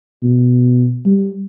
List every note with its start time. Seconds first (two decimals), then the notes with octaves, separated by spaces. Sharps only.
0.23 B2
1.05 G3